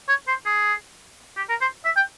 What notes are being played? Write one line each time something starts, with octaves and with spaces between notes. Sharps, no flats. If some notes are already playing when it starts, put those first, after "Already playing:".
C#5
C5
G#4
G4
A#4
C5
E5
G5